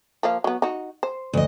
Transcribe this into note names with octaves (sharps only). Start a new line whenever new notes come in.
F3 A#3 F5
F#3 B3
D#4 F#4
C5
D2 D#5